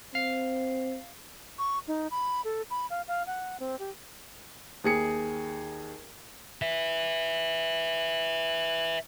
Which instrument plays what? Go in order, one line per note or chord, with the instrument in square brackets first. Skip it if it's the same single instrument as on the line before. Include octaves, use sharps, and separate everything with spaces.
[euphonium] C4 [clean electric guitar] F5
[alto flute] C#6
D#4
B5
A4
B5
F5
F5
F#5
C4
G4
[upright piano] D#2 G#4 C#7
[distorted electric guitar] B4 E5